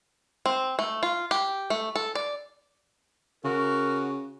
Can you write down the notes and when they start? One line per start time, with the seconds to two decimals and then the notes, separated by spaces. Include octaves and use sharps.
0.46 C4
0.79 A3
1.03 F4
1.31 G4
1.70 A3
1.96 A4
2.15 D5
3.45 C#3 F#4 A#4